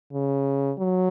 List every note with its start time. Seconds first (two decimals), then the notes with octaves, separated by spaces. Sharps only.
0.13 C#3
0.78 F#3